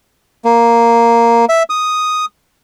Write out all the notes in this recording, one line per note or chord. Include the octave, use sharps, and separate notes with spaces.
A#3
E5
D#6